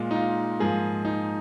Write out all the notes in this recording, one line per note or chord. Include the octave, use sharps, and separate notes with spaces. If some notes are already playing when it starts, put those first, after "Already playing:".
Already playing: A#2 G#3 F4
D#4
F4
G#2 F3 A#3 G#4
D#4